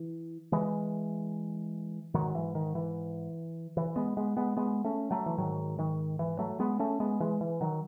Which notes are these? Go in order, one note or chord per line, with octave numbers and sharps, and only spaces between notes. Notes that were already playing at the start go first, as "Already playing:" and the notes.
Already playing: E3
E3 G#3
G#2 D#3 F#3
E3
D#3
E3
E3
G#3 B3
G#3 B3
G#3 B3
G#3 B3
A3 C#4
F#3 A3
E3
G#2 D#3 F#3
D#3
E3
F#3 A3
G#3 B3
A3 C#4
G#3 B3
E3 G#3
E3
D#3 F#3